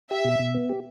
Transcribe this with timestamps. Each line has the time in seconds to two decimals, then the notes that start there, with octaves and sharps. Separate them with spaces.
0.10 G4 E5
0.25 B2
0.39 B2
0.54 B3
0.69 G4